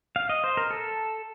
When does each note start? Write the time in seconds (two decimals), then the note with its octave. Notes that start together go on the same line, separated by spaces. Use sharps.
0.16 F5
0.29 D#5
0.44 C5
0.57 A#4
0.71 A4